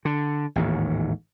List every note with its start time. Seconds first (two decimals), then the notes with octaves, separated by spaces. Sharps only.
0.05 D3
0.56 A1 D#2 G#2